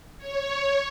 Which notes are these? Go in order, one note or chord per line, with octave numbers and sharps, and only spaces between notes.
C#5